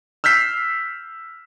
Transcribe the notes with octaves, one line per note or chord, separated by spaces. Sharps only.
E6 F6 G6 B6 C7